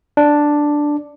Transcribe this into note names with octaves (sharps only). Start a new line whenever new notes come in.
D4